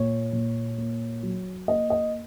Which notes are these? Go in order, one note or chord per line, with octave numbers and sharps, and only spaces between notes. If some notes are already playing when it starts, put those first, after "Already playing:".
Already playing: A#2 C#5
A#2
A#3
F#3
A#3 D#5
D#5